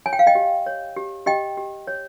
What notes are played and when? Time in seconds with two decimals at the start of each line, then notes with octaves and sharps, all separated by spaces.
0.06 C#5 G#5
0.13 G5
0.19 F5
0.27 D#5 G5
0.35 G4
0.66 C#5
0.97 G4
1.26 G4 D#5 G5
1.57 G4
1.87 C#5